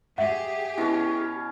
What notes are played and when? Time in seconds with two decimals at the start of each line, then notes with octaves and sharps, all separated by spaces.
0.18 G4 G#4 E5 F#5
0.78 B2 C#4 E4